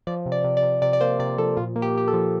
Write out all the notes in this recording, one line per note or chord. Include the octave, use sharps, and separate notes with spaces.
F3 D5
C3
D5
C3
D5
C3
C3 D5
D5
A#3 C5
C3 D5
F3 A4
A#2 F4
A#3
G4
A#3 G4
A4
F3